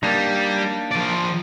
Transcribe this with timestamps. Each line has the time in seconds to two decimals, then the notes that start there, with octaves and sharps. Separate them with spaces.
0.03 G3 A#3 D4 D#4
0.91 F3 D5